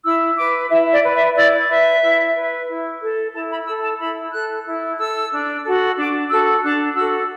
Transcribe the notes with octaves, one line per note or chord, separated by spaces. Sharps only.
E4 E6
B4 D6
E4 E5
D5
B4
E5
E4 D5
B4 E5
E4
B4
E4
A4
E4 A5
B5
A4 E6
A5
E4 B5
A4 F#6
E4
A4 E6
D4
F#4 A4
D4 D6
F#4 A4 E6
D4 F#6
F#4 A4 E6